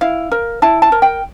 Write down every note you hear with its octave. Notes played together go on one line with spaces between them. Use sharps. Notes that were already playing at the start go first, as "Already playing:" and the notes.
E4 F5
A#4
E4 A5
A5
A#4
G5